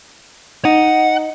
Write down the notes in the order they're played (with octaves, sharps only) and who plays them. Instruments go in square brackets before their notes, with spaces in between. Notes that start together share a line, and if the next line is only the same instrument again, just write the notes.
[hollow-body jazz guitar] D#4 [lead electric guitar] F#5